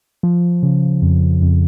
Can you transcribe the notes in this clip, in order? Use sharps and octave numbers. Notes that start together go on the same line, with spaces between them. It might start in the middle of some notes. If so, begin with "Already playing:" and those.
F3
C#3
F2
F2